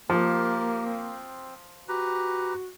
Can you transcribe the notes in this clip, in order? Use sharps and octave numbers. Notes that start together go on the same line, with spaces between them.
F3 A#3 G4 A#4
C4
F#4 G4 B4 A#5